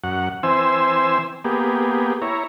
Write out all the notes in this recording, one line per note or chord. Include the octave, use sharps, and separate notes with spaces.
F#2 F#5
E3 C4 C5 G#5 E6
A#3 B3 G4 G#4
E4 C#5 A#5